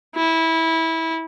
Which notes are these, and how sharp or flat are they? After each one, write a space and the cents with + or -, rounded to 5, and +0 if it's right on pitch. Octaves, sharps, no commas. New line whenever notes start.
E4 -20